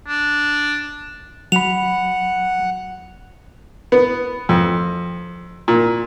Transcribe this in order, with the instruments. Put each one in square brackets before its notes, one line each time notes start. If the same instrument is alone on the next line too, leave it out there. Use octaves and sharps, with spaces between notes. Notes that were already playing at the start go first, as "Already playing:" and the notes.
[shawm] D4
[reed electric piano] F#3 B5 [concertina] F#5 [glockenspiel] F7
[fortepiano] B3
F2
A#2